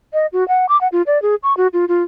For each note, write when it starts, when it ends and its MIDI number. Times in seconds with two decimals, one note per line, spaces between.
0.13 0.26 75
0.33 0.47 66
0.48 0.66 78
0.69 0.79 86
0.81 0.88 78
0.92 1.02 65
1.07 1.21 74
1.22 1.35 68
1.43 1.56 85
1.57 1.67 66
1.73 1.85 65
1.88 2.03 65